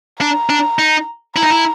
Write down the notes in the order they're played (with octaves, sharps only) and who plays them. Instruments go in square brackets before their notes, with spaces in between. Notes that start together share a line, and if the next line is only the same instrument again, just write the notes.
[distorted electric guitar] D4 [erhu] A#5
[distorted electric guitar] D4
D#4
[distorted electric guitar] E4 [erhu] A#5
[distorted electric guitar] D#4
E4